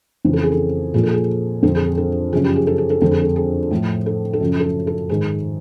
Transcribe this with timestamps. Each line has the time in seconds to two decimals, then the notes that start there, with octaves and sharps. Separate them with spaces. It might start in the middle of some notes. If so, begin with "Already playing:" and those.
0.25 F2 C#3 E3
0.33 A4
0.43 G#4
0.52 A4
0.94 A#2 F3 G#4
1.03 A4
1.13 G#4
1.63 F2 D3 F3 A4
1.75 G#4
1.86 G#4
1.97 A4
2.32 F#2 C#3 F3 G#4
2.44 G4
2.56 G#4
2.67 A4
2.78 G#4
2.90 A4
3.02 F2 D3 F3 A4
3.11 G#4
3.21 A4
3.36 G#4
3.71 A2 F3
4.06 A4
4.33 A4
4.40 F#2 C#3 F3
4.60 A4
4.87 A4
5.09 G#2 D#3 G#4